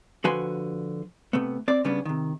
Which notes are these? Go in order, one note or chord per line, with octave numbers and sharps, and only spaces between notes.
D3 F3 F#4 B4 G#5 C6
C3 A3 B3
C4 D5
C#3 G3 B3 C#4 D4
C3 D#3